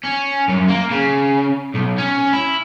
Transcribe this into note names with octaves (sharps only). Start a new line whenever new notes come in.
C#4
F#2
A#3
C#3
B1
C#4
E4